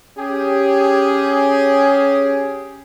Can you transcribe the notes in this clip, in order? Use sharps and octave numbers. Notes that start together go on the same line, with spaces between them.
C#4 G4 G#4